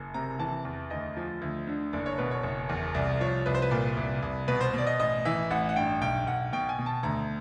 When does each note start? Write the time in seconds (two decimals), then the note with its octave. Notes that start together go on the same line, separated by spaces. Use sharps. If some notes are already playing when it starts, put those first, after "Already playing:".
Already playing: F#1
0.14 C3 A#5
0.39 E3 A5
0.65 E2
0.90 D2 D#5
1.16 F3
1.42 D2
1.67 D3
1.93 F#1 D5
2.06 C#5
2.18 B2 B4
2.31 C#5
2.43 F#1
2.69 E2
2.94 C2 D5
3.20 F3 C#5
3.46 C2 B4
3.55 C5
3.62 B4
3.71 A#2
3.97 C2
4.22 C2
4.48 B2 B4
4.61 C5
4.74 B2 D5
4.87 D#5
4.99 A1 D#5
5.25 E3 E5
5.50 A1 F#5
5.69 F#5
5.76 G2 G5
6.01 B1 G5
6.26 B1 F#5
6.52 B2 G5
6.69 G#5
6.79 B2
6.86 A5
7.03 D2 A#5